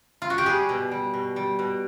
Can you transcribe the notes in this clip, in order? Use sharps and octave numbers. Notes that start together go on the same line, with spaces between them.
F4
F#4
G4
G3 G#4
B2
G3
B2
G3
B2